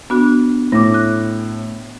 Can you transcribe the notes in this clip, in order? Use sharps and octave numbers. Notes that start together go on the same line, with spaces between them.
B3 D4 F#4
A2 D6 A#6
F#6